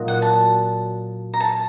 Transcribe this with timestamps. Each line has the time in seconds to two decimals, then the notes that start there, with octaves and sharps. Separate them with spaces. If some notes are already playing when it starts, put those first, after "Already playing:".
Already playing: A#2 F#3 A#3 D#4 F#4
0.08 F#5
0.22 A5
1.33 A#5
1.40 A5